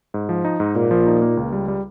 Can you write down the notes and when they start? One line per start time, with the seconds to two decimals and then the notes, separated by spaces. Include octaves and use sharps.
0.14 G#2
0.29 F3
0.45 D#4
0.60 G#2
0.75 A#2 A#3
0.91 F3
1.07 D#4
1.22 A#3
1.37 C#2
1.53 G3
1.68 G3